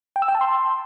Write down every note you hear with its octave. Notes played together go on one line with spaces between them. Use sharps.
G5
E6
G5
A5
C6